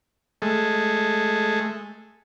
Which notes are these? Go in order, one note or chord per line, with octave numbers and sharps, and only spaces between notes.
G#3 A3